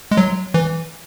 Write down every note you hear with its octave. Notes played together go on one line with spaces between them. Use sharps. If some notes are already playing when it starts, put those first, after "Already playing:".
G#3
F#3
E3